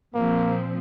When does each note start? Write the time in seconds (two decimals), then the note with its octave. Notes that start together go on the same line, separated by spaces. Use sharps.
0.15 A#2 F3 A#3 C4